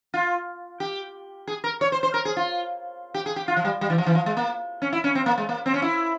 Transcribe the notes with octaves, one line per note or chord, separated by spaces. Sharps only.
F4
G4
G#4
A#4
C#5
C5
C5
A#4
G#4
F4
G4
G#4
G4
F4
F3
G3
G3
E3
F3
E3
F3
G#3
A#3
C#4
E4
C#4
C4
A#3
G#3
A#3
C4
C#4
E4